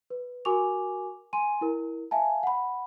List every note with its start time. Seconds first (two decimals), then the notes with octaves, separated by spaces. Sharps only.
0.10 B4
0.45 F#4 A#4 G#5 C#6 D6 F7
1.33 G#5 C6 D#7
1.61 E4 A#4
2.11 E5 F5 G#5 A5
2.43 F#5 B5